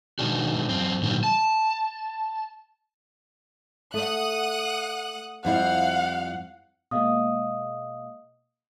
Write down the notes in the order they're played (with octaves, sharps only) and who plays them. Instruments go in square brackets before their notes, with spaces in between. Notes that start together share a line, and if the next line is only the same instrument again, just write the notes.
[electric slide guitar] B2 D#3 G#3 D4 F#4
F#2 C4
A#2 D3 D#3 F#3 G3
A5
[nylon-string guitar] A3 [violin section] F#5 D#6 F#6
[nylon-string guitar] F2 G3 E4 [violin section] F5 [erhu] F#5
[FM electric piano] B2 G#3 A#3 [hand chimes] D#5 F5 D#6